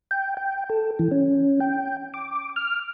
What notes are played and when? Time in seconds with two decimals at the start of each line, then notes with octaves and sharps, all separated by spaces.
0.11 G5
0.37 G5
0.70 A4
0.99 E3
1.11 C#4
1.60 G5
2.14 D6
2.56 F6